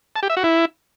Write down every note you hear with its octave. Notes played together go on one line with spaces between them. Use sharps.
A5
G4
E5
F#4
E4